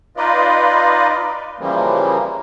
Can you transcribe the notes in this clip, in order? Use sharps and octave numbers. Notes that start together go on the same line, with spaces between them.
D#4 F4 B4 D5 D#5
C#3 E3 F3 G3 A#3